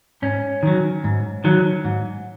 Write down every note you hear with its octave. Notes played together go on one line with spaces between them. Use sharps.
G#2 C#4
D#3 F#3
G#2
D#3 F#3
G#2